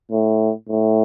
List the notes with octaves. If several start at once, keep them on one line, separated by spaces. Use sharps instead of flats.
A2
A2